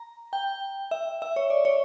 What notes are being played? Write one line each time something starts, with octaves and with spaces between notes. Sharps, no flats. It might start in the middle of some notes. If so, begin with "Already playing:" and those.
Already playing: A#5
G5
E5
E5
C#5
D5
C#5